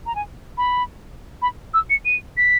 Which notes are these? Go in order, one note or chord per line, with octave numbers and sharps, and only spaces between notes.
A#5
G#5
B5
B5
E6
C#7
D#7
B6